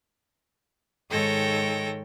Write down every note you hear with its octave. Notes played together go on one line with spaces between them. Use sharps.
G#2 D#3 A4 C#5 G5 A#6